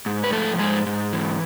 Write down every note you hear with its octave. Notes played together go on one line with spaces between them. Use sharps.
G#2
B4
F3 A3 A4
G#2 G#3 G#4
G#2
E3